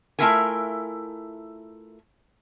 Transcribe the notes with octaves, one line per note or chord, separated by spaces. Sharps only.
A3 C4 E4 F4 A#4 G#5